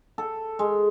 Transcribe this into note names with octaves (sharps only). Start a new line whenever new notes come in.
A4
G#3